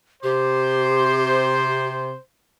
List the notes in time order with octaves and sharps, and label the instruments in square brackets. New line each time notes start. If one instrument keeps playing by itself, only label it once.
[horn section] C3 C5 [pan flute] G4